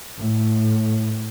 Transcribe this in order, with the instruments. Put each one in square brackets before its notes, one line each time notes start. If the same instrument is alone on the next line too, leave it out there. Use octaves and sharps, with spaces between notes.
[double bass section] A2